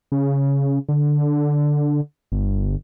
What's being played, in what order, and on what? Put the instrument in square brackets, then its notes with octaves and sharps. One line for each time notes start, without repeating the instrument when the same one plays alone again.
[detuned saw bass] C#3
D3
G1